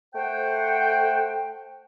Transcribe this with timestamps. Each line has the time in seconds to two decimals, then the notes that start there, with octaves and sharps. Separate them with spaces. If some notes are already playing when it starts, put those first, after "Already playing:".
0.14 A3 C5 F#5 G5